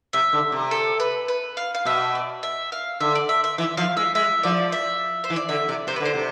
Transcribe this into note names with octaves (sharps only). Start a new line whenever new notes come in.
C3 E5
D3
C3
A4
B4
B4
F5
F5
B2 E5
D5
E5
F5
D3 E5
D5
E5
E5
E3 E5
F3 F5
G#3 E5
G#3 E5
F3 D5
E5
C5
E3
D5
D3 E5
C3 D5
C3 C5
B4
D3
C5
C3